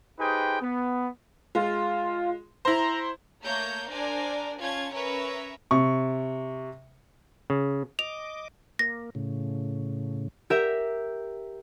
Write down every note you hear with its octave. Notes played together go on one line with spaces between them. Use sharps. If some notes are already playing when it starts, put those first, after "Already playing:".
D#4 G4 G#4 B4 C5 G5
B3
G#3 F4
E4 C5 A#5
A3 A#3 C#5 A#5 G6
D4 A#4 C5 D5 G#5
C#4 F4 A5 G#6
C#4 A#4 B4 C#5 E5
C3 C#6
C#3
D#5 D6 F7
A#3 A#6
A2 C#3
G4 A#4 E5